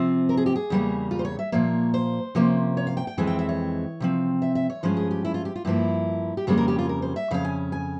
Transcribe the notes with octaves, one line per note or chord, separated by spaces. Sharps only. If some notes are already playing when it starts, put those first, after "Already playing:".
Already playing: C3 F3 C4
A#4
G#4
G4
G#4
E2 C#3 G3 A#3
F4
C5
C#5
E5
A#2 F3 A#3 C#5
C5
C3 F3 A#3 C#4
C#5
F5
G5
G5
F2 E3 G#3 C4 G#5
G5
E5
C#5
C3 F3 C4
E5
E5
C#5
G2 F3 G#3 C#4 C5
G#4
G4
E4
F4
G4
F4
G2 F3 A#3 E4
G4
F2 C#3 G3 A#3 C#4 G#4
A#4
G4
F4
A#4
C5
E5
F2 C#3 C#4 F5
G#5
G#5